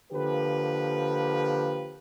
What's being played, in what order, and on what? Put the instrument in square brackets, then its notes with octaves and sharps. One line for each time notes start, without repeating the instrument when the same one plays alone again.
[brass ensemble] D3 F3 A#3 G4 B4